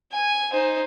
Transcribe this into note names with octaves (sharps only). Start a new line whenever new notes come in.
G#5
D#4 C5